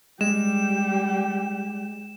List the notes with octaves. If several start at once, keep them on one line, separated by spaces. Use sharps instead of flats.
G3 G#3 G5 E7